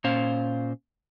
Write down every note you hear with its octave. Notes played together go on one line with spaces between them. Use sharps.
A#2 C#4 C5 F5